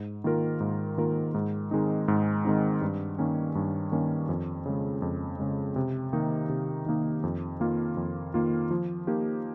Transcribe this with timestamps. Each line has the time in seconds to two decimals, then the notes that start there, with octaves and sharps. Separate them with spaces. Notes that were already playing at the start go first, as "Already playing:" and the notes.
Already playing: G#2
0.24 D#3 A#3 F4 A#4
0.60 G#2
0.97 D#3 A#3 F4 A#4
1.34 G#2
1.71 D#3 G#3 C4 D#4
2.08 G#2
2.45 D#3 G#3 C4 D#4
2.81 G2
3.18 D#3 A#3 C#4
3.55 G2
3.92 D#3 A#3 C#4
4.29 F2
4.66 C#3 G#3
5.02 F2
5.39 C#3 G#3
5.76 C3
6.13 D#3 A#3 D#4
6.49 C3
6.86 D#3 A#3 D#4
7.23 F2
7.60 D#3 A#3 F4
7.97 F2
8.34 D#3 A#3 F4
8.71 F3
9.07 A#3 D#4 G4